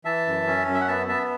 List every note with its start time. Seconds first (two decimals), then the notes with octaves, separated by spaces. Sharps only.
0.05 E3 E5 A5
0.26 F#2
0.47 C#4
0.67 F#2
0.74 E5
0.81 F#5
0.88 B3 E5 A5
1.08 B3 E5 A5